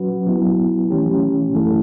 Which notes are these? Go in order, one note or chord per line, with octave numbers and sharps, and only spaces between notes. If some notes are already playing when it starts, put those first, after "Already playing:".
Already playing: F#3 C#4 F#4 B4
F#3 B3 E4
E3 A3 C#4 G4
F#2 E3 A3 E4 A4